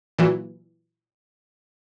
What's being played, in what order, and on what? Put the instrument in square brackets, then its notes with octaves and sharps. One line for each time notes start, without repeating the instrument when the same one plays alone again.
[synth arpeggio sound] A#2 E3 F#3